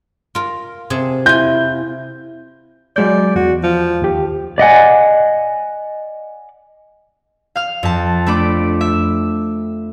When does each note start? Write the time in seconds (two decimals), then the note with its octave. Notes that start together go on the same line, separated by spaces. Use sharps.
0.35 F4 A#4
0.90 C3 G#4 A5
1.26 E4 F4 G#5 G6
2.96 F#3 G#3 D5 G6
3.36 E2 F#4
3.63 F3
4.02 D#2 G4
4.58 D5 D#5 F#5 G#5
7.56 F5 F6
7.83 F2 A5
8.26 A3 D4 B5 D6 D7
8.81 E5